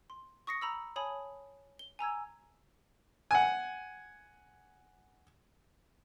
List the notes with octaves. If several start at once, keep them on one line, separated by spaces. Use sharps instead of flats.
C6
C#6 D#6 A#6 C7 C#7
A#5 B5 E6
C#5 G#5 A5 B5 D#6
G7
G#5 A#5 E6 G#6
F#5 G#5